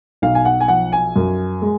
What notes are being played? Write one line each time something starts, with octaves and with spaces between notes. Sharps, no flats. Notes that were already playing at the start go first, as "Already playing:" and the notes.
B1 F5
G#5
F#5
G#5
F3 F#5
G#5
F#2
G#3